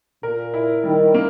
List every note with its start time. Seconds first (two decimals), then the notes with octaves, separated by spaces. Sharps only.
0.23 A#2 A#4
0.54 E4
0.84 D#3 G3
1.14 A#3